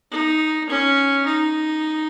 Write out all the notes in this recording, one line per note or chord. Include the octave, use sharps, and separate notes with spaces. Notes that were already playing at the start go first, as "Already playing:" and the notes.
D#4
C#4
D#4